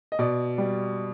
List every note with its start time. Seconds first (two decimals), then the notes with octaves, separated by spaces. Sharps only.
0.12 D#5
0.19 B2 D5
0.58 G3